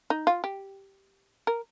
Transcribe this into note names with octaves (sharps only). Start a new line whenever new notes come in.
D#4
F4
G4
A#4